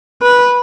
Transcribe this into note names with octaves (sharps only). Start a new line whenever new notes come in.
B4